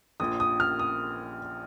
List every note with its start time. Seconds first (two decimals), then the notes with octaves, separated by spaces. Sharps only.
0.20 A#1 A#2 F3 D#6
0.40 D#6
0.60 F6
0.79 D#6